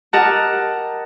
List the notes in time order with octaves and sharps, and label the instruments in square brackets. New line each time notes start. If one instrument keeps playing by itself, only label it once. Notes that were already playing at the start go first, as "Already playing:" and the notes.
[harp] G4 A#4 D#5 F#5 A5